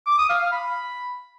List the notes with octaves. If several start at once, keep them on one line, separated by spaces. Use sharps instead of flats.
D6
D#6
F5
F5
B5